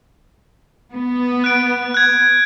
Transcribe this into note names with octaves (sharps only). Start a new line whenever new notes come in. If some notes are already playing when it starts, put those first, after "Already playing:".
B3
F#6 D7
F#6 G#6